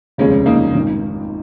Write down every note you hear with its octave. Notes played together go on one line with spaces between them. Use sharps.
F1 D#2 C#3 G#3 C#4
A#3 D#4
G#1 G#2 D#3